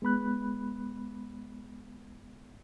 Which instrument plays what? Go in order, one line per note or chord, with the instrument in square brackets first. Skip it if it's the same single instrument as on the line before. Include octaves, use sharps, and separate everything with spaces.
[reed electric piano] G#3 B3 B5 F#6